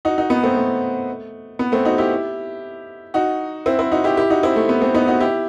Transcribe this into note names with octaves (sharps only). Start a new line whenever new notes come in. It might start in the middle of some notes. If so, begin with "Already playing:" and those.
D#4 F#4
D#4 F#4
B3 D#4
A3 C4
A3
B3
A3 C4
D#4 F#4
E4 G4
D#4 F#4
C4 E4
C4 E4
D#4 F#4
E4 G4
E4 G4
D#4 F#4
C4 E4
A3
B3
A3 C4
B3 D#4
D#4 F#4
E4 G4